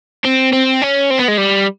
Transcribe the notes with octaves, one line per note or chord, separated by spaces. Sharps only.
C4
C4
C#4
C4
B3
G#3
G3